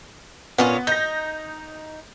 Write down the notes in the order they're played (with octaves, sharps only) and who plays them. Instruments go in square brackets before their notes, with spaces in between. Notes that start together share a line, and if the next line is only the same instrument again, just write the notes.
[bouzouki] A#2 C#4 F4 [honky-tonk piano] B3
[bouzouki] D#4 [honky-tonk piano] G6 A#6